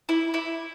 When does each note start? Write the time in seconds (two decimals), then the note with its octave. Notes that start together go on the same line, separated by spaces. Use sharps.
0.09 E4
0.34 E4